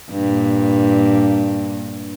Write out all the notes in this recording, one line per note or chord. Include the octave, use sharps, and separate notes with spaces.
G2 A#2